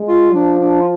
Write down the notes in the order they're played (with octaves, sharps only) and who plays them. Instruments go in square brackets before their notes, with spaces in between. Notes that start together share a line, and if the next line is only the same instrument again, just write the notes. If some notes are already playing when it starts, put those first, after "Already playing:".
Already playing: [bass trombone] G#3
[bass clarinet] F4
[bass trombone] F3 [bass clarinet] D4
[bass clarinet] D4
F4